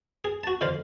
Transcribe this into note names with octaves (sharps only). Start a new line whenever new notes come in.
G#4
F#4 A5
F2 D3 F4 C5 F5